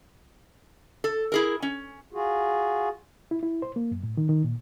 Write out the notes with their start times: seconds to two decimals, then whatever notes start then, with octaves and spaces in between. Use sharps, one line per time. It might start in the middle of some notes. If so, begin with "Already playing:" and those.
1.04 A4
1.32 E4 G#4 A#4
1.62 C#4
2.13 F4 F#4 G#4
3.31 E4
3.43 E4
3.62 C5
3.76 A#3
3.91 F#2
4.03 A2
4.17 D#3
4.29 D#3
4.44 A#2